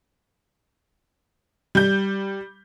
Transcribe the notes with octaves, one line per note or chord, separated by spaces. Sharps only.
G3 G6